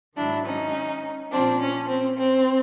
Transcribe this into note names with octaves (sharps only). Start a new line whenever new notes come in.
G#2 D#3 F#3 D4 E4
C#4 D#4
A#2 F3 C4 D4
C#4
C4
C4